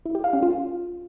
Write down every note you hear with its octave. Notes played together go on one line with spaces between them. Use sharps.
E4
G4
F5
C#4
F4